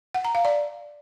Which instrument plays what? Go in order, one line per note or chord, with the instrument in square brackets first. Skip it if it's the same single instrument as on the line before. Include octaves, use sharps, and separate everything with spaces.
[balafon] F#5
A#5
F5
D5